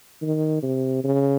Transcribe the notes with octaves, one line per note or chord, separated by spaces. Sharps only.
D#3
C3
C#3